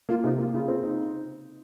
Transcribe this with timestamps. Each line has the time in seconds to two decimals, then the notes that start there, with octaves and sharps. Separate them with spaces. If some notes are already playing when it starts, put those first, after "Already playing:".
0.09 A#3 F4
0.24 C3 D#4
0.38 A#3 F4
0.53 C#3 F4
0.68 C4
0.83 D#4